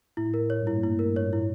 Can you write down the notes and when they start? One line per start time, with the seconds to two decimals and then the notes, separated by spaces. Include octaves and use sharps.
0.17 A2 E4
0.34 A#4
0.40 A2
0.50 C#5
0.61 G2 A#2
0.67 E4
0.83 E4
0.99 A#4
1.16 C#5
1.33 E4